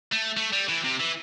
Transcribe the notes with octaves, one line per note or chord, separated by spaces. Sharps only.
A3
A3
G3
E3
C3
E3